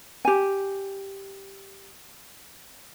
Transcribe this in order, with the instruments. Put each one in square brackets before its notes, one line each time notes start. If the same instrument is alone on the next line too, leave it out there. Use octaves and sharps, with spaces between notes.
[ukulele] G4 G#5